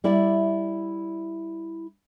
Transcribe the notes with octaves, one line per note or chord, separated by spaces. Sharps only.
G3 E4 D5 E5